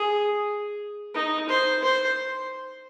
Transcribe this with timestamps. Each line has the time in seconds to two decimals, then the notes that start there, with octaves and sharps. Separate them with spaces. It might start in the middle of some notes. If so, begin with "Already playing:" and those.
Already playing: G#4
1.14 D#4
1.49 C5
1.83 C5